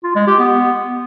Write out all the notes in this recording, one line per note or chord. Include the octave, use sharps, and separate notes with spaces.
F4
G#3
G4
B3